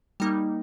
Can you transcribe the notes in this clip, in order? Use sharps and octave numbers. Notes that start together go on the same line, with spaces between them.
G3 A#3 D#4